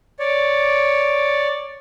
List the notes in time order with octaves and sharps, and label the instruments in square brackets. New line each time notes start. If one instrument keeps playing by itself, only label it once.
[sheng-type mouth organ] C#5 D5